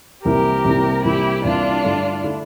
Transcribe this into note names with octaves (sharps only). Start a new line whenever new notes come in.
C2 C3 E3 A#3 G4 A#4
C2 C3 E3 A#3
C2 C3 E3 A#3 E4 G4
C2 C3 E3 A#3 D4 F4
G2 D3 A3 E4
D3 A3 E4